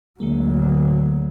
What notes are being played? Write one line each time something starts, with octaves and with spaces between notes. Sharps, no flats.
D2 D3 F#3 G#3 A#3